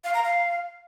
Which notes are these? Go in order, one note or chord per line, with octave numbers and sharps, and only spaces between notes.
F5
A#5
F5